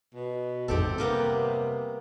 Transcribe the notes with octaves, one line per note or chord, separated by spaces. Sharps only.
B2
G#1 F2 G#2 C3 C4 G4 A4
G3 A#3 B3